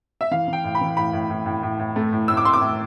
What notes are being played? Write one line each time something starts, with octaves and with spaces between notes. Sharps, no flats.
E5
E3 F5
E3
G5
A2
B5
E3
A2 B5
A2
A2
A2
A2
A2
A3
A2
A2 E6
D6
A2 C6
D6
A2